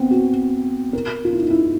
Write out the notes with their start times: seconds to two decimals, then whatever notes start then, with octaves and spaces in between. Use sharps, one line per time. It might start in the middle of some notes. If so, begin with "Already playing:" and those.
Already playing: B3 C4
0.11 F#4
0.93 A#4
1.25 F4
1.33 E4
1.42 D#4
1.50 E4